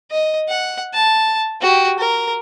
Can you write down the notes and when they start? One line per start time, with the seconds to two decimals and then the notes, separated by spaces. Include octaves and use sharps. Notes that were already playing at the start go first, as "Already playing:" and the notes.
0.11 D#5
0.49 F#5
0.94 A5
1.61 F#4 G4
1.98 A#4